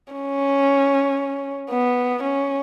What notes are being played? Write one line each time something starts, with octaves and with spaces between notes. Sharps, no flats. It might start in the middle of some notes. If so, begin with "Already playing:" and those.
C#4
B3
C#4